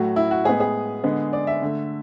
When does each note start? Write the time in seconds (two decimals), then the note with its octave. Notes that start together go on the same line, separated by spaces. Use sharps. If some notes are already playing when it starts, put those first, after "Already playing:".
Already playing: A2 F#3 A3 F#4
0.16 E4
0.31 F#4
0.45 A2 G#3 B3 G#4
0.60 G#4
1.04 D3 G#3 B3
1.33 D5
1.47 E5
1.62 D3 A3